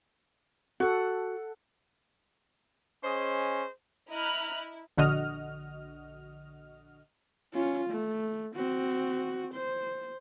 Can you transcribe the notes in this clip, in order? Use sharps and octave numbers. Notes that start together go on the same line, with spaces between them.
F#4 A4 F#5
C#4 G#4 C5 D#5
E4 D#5 A#5 B5 F6 F#6
E4
A#1 D3 F#4 D#5 F6
C#4 F4
A3
C4 F#4
C5